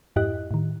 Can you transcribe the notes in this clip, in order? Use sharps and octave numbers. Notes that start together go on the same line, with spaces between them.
F2 G#2 E4 G4 D#5 F#6
A2 D#3